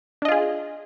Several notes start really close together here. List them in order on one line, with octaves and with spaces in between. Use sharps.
D4 D#5 F4 G#4